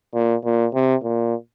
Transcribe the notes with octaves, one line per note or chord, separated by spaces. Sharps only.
A#2
A#2
C3
A#2